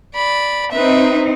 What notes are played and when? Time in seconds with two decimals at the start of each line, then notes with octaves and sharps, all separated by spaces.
0.15 D5 B5
0.72 C4 D#4 B4 E5